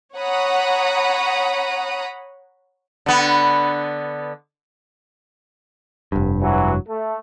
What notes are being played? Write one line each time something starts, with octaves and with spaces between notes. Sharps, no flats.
C#5 F#5 A#5 B5 D#6
D3 B3
F1 G2
E3 F#3
A3